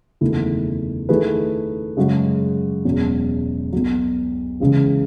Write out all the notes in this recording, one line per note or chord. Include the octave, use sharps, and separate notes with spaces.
F#1 E2 D#3 A3 E4
D#3 A3 E4 G#4 B4
F#2 C#3 G#3 C#4 F#4
E1 E2 B2 F#3 C#4
B1 B2 F#3
C#2 C#3 E3